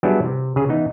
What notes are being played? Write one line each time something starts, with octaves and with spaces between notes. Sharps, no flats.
F#3 G3 B3 D4 E4 G#4
C3
C#3 G#4
E3 B3 D#4